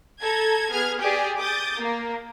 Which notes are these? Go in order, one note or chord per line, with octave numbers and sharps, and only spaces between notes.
A4 A#5 G#6
B3 G#4 F6 G#6
G4 G#4 D5 G5 G#5
D6 D#6 G6 A6
A#3